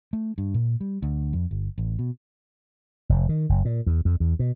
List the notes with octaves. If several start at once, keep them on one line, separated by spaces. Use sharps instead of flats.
A3
G2
A#2
G3
D2
F2
G1
A1
B2
F1
D#3
F#1
A#2
E2
F2
E2
B2